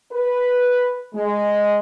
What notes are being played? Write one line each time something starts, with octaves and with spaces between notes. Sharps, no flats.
B4
G#3